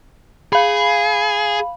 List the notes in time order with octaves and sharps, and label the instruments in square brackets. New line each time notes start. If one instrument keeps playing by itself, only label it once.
[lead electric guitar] G#4 [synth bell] F5 B5